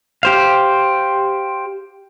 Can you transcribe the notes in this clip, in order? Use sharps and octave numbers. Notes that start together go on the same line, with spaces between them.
G4 C5 F5